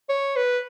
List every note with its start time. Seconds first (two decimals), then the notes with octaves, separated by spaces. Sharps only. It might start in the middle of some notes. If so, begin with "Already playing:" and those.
0.09 C#5
0.36 B4